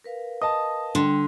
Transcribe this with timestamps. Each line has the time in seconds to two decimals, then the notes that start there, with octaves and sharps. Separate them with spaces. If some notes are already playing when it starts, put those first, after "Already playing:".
0.04 A#4 B4 F5
0.42 D#5 A5 D#6
0.95 D3 G3 D4 G5 C6